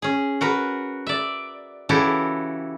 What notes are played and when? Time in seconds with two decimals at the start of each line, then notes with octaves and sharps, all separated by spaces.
0.02 C#4 G#4
0.41 F#4 A#4 B4
1.07 D5 E5
1.89 C#3 E3 E4 F#4 G4 A4